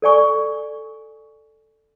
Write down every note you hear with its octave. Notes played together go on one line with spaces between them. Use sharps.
A4 D5 G#5 C#6